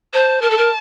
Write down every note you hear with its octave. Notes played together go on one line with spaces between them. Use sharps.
C5 A5
A#4 A5
A4
A#4